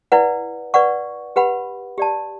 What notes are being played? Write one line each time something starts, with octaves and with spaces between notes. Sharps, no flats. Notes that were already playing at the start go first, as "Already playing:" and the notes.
E4 B4 D5 F#5
B4 D5 F#5 C#6
G4 B4 F#5 B5
G4 D5 A5